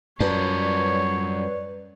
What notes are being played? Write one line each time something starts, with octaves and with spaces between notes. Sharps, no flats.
F#2 G3 F4 B4 C#5 D5 A5